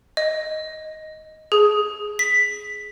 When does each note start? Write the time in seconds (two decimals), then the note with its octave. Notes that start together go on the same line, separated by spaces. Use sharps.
0.17 D#5
1.52 G#4
2.19 B6